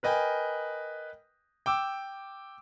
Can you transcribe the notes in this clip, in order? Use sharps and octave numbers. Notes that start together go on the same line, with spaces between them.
A#4 B4 D#5 G5 G#5
G5 D6 E6